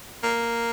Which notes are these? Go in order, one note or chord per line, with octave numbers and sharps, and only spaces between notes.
A#3